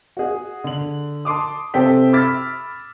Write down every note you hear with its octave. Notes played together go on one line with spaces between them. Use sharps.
F#4 G#4
D3 F#7
A5 C6 D6 D#6
C3 C4 A4 G5 B6
B5 D6 E6 F6 A6 B6